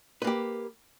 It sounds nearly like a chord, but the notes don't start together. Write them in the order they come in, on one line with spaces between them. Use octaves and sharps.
B4 A#3 G4